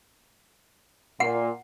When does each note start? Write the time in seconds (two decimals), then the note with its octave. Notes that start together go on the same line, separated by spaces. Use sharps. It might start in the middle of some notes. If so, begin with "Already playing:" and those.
1.20 A#2 F#5